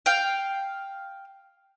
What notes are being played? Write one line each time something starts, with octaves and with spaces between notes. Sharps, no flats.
F5 G5